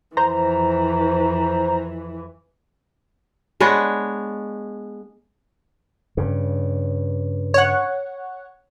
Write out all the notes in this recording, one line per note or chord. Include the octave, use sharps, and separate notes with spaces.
F2 E3 C5 A#5
G#3 B3 D4 C#5
G2 C#3
C#5 F#5